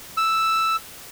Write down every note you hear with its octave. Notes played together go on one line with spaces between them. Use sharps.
E6